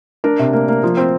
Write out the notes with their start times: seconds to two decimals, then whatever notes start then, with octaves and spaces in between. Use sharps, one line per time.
0.24 D4 A#4
0.39 C3
0.53 A#3
0.68 A#3
0.83 F3
0.97 C4